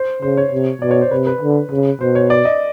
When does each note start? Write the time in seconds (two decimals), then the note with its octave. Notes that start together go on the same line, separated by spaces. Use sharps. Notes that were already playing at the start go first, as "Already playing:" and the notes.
Already playing: C5
0.22 C#3 C5
0.37 C#5
0.52 C3
0.81 B2 D5
0.91 C#5
1.01 C5
1.11 C3 B4
1.27 B4
1.41 D3
1.70 C#3
2.01 B2 C5
2.15 C#5
2.30 D5
2.45 D#5